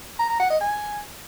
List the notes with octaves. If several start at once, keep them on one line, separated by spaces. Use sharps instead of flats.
A#5
A#5
F#5
D#5
G#5